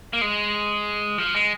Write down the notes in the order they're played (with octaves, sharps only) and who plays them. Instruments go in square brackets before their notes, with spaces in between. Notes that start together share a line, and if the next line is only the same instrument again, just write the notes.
[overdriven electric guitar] A#3
G#3
F3
G#3